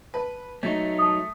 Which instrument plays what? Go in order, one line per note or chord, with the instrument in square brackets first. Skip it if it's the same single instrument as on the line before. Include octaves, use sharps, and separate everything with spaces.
[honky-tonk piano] B4 [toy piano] A5
[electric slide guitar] F#3 D#4 [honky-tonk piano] A3
[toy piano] A5 D#6